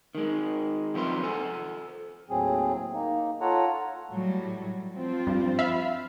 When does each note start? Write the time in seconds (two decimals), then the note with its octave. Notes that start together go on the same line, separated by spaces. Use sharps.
0.15 D#3 G#3
0.94 D#3 F3 C4 B4 C6
1.23 A4 C5 G#5
2.30 D#2 A2 F#3 C4 G#4
2.94 A#3 D#4
3.41 F4 A4 C#5 F#5 A#5
4.12 A2 F#3 G3
4.93 F3 C4 F4
5.27 G2
5.59 E5 F5 B5